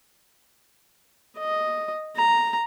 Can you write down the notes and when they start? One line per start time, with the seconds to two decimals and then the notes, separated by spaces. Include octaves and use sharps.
1.38 D#5
2.16 A#5